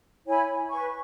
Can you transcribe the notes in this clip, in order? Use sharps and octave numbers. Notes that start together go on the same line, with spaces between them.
E4 C#5 G#5 B5
B4 G#5 C#6